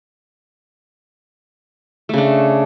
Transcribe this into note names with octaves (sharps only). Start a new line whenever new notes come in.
C#3 A3 D4